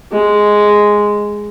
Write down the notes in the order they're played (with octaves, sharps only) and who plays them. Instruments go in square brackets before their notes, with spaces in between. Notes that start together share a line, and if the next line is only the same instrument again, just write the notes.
[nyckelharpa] G#3